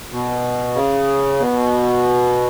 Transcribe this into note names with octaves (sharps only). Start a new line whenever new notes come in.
B2
C#3
B2